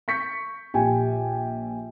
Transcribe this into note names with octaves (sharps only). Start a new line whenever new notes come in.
C#6 G6 B6 C#7
A#1 G4 G5 G#5